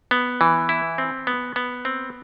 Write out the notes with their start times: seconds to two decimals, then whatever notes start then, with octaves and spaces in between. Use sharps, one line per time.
0.11 B3
0.41 E3
0.69 E4
0.98 C4
1.27 B3
1.56 B3
1.85 C4